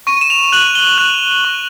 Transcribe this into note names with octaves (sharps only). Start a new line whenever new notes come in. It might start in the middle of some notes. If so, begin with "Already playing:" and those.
C#6 D#7
E7
F7
F#6 F#7
G7
F#6 F#7
C#6